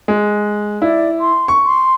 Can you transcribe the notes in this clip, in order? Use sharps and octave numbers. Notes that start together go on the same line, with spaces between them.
G#3
E4 D5
C6
C#6
C6